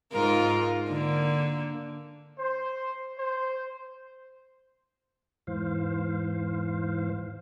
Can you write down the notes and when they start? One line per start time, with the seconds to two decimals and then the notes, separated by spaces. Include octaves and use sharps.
0.12 G#2 F4 A#4
0.88 D3 A#3
2.38 C5
3.18 C5
5.47 E2 G#2 E3 C5 F5